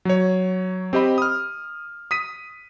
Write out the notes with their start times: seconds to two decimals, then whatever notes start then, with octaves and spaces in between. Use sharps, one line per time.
0.05 F#3 C#5
0.93 C4 G4 D#5 B5
1.18 D#6 F6
2.11 D#6 B6 D#7